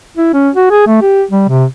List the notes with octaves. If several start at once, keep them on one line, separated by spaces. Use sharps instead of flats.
E4
C#4
F#4
G#4
A3
G4
G3
C3